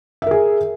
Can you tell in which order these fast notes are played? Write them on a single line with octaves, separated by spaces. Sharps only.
E5 A#4 G#4